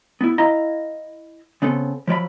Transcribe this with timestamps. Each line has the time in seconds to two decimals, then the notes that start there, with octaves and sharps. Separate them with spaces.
0.21 B3 E4
0.38 E4 D#5 F5 A#5
1.62 C#3 B3 C4 A4
2.07 F3 F#3 D5 B5